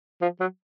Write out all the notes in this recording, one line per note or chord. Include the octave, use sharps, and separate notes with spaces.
F3
F#3